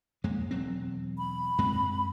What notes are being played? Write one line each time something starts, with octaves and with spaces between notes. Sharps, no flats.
F2 G#3 A#3
E1 F#3 C4
B5
F#2 G#3 C4